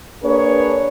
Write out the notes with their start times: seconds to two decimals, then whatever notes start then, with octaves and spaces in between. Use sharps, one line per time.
0.24 A#3 D4 G#4 B4 C#5